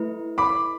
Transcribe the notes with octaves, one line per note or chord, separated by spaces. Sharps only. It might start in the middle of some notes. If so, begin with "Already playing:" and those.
Already playing: A3 E4 B4
B5 D6